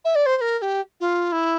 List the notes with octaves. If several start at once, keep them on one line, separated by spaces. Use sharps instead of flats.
E5
D5
C5
C5
A#4
A#4
G4
F4
E4